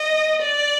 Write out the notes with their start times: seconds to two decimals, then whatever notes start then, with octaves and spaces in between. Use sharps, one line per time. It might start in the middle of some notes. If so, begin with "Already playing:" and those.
Already playing: D#5
0.42 D5